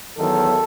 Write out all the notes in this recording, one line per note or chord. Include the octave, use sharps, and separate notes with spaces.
E2 D#3 F#3 A4